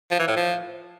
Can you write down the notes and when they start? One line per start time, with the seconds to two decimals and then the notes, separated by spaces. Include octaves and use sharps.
0.11 F3
0.19 E3
0.28 A2
0.36 F3